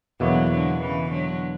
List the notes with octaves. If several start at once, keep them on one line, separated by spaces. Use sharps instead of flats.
E2 B2 D3 F#3 A#3 E4
D3 F#3
C#3 E3
D3 F#3